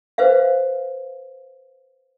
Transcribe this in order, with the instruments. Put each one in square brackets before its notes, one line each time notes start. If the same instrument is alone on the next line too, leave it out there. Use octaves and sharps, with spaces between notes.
[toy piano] B4 C5 E5 F5